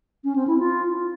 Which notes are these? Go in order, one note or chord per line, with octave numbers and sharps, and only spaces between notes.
C#4
C4
E4
F4